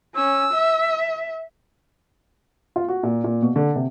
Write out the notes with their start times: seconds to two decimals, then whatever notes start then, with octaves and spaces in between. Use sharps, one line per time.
0.15 C#4 E6
0.53 E5
2.76 F4
2.88 F#4
3.03 A#2
3.24 A#2
3.42 B2
3.56 D3
3.76 C3